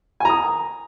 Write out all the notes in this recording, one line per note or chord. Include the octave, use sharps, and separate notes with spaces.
G#5 A#5 D#6